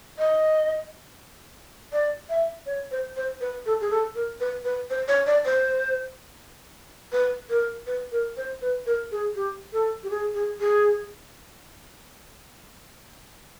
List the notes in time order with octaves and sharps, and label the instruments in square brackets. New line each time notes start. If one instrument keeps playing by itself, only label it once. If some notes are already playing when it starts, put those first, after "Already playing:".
[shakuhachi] D#5
D5
E5
C#5
C5
C5
B4
A4
G#4
A4
A#4
B4
B4
C5
C#5
D5
C5
B4
A#4
B4
A#4
C5
B4
A#4
G#4
G4
A4
G4
G#4
G#4
G#4